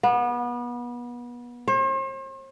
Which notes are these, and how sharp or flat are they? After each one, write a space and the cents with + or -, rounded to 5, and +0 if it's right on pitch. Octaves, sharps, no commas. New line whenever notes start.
B3 -30
C5 +45